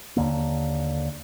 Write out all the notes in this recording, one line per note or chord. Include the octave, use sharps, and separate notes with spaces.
D#2 D3 A#3